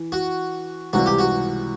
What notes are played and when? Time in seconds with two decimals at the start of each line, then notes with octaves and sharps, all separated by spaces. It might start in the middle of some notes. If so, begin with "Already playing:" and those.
Already playing: E3
0.12 F#4
0.93 C#2 C3 E3 G3 F#4
1.06 G4
1.19 F#4